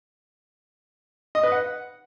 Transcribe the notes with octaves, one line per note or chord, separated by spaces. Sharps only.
D#5
B4
F#5